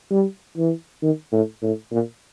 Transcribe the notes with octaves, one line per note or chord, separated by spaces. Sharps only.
G3
E3
D#3
A2
A2
A#2